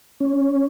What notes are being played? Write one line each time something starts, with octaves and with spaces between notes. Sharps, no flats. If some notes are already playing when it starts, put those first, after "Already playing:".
C#4